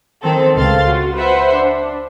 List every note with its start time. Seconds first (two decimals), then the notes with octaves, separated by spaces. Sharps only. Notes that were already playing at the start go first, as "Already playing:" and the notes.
0.22 D#3 C4 A4
0.55 C#2 A3 C4 F5 C6 A6
0.85 F4 F#4
1.16 B4 C5 E5 F#5 C6
1.53 D4